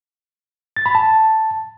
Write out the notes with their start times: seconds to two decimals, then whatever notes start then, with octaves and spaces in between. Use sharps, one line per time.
0.76 A6
0.86 B5
0.95 A5